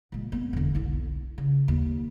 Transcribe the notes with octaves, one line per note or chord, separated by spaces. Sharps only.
A#2 G#3
B3 C4
E1 D3
B1 E4
C#3
D#2